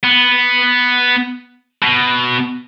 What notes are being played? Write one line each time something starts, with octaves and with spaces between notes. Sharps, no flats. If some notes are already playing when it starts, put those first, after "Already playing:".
B3
B2